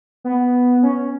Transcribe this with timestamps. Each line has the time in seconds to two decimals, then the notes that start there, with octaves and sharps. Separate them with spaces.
0.24 B3
0.83 C#4